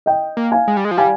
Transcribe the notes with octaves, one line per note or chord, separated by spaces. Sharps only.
D#5 G5
A#3
F5 G#5
G#3
G3
G#3
F3
G3 F5 G#5